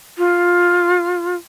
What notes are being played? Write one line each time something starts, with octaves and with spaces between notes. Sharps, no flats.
F4